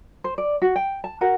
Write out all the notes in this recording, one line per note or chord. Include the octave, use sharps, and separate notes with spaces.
C5
D5
F#4
G5
A5
F#4 A#4 F#5